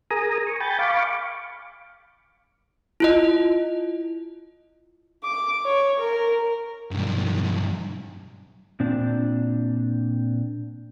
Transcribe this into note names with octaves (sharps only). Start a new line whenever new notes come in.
G#4 A#4 G#5 A#5 D#6
C#6
G5 G#5 B5 G6 A6
F5 B5 C#6 D6
E4 F4 D#5
D6
C#5
A#4
B1 G2
A#2 C4 D4